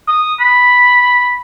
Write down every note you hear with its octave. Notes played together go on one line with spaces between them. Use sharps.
D#6
B5